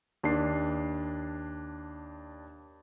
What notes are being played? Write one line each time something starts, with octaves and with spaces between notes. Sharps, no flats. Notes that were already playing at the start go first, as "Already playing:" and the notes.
D#2 D4 C7